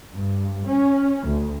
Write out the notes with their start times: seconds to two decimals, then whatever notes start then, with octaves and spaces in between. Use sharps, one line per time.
0.14 G2
0.68 C#4
1.27 D2